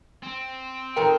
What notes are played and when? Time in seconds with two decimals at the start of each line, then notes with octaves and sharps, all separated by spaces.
0.23 C4
0.96 F2 D#3 A#4 G5